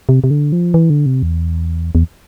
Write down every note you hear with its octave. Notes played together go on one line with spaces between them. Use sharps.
C3
C3
D3
F3
E3
D3
C3
E2
E2